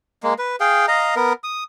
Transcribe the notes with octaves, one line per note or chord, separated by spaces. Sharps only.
G#3 A#3
B4
G#4 F5 G5
D#5 F5 A#5
B3 A#4
D#6